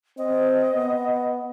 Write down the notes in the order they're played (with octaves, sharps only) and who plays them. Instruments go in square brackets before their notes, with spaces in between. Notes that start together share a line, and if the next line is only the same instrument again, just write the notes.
[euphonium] C4 [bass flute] D#5
[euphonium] B3